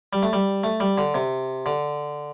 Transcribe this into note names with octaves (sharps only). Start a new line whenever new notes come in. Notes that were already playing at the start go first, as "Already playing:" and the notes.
G3
A3
G3
A3
G3
D3
C3
D3